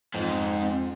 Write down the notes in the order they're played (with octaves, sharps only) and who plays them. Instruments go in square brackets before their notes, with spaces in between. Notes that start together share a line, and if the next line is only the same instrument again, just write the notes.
[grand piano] F2 [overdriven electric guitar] G#2 [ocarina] C4